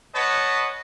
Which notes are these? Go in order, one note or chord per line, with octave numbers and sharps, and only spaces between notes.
B4 C#5 D#5 F#5 A5